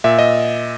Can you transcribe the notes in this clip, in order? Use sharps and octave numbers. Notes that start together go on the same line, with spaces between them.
A#2 E5
D#5